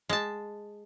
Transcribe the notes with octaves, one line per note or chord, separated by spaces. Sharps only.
G#3 A5